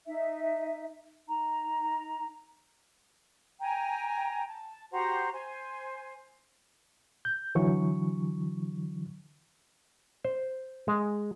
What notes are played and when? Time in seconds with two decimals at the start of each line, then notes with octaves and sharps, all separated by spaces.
0.07 D#4 E5
1.27 D#4 A#5
3.60 G5 G#5 A#5
4.48 A5
4.91 F#4 G4 C5 A#5
5.33 C5 G#5
7.25 G6
7.55 D3 E3 F#3 C#6
10.25 C5
10.88 G#3